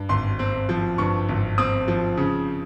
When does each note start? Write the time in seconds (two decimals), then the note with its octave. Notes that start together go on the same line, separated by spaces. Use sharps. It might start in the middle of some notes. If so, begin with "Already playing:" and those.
Already playing: G2
0.09 G#1 C6
0.39 C4
0.69 F3
0.98 G2 C#6
1.29 G#1
1.58 C4 D#6
1.88 F3
2.17 C#3